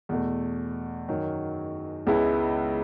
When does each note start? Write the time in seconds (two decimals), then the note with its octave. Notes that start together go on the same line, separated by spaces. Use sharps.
0.09 E2 B2 A3
1.09 F#2 D#3 F#3
2.07 C#2 C#3 G#3 B3 E4